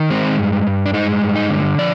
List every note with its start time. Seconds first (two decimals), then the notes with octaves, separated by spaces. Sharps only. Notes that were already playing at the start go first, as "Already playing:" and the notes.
Already playing: D#3
0.10 G#3 C4
0.38 G2
0.67 G2
0.86 D4
0.94 G#3 D#4
1.22 G2
1.36 D#4
1.50 D3
1.78 F3 D5